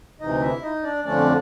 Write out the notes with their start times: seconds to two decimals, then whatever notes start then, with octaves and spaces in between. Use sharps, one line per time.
0.21 D2 C3 E3 D#4 D#5
0.41 E4 E5
0.62 D#4 D#5
0.83 D4 D5
1.04 F2 D3 F3 A3 C#4 D4 D5